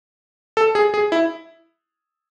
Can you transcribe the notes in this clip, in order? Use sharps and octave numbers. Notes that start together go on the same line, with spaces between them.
A4
G#4
G#4
E4